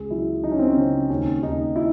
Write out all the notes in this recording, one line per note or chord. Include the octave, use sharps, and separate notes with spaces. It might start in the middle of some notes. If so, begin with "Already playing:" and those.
Already playing: C#2 G#4
F#3 E4
F#3 D#4
C#4
C4
C#4
C#3 C4
D#2 C#4
D#2 D#4
E4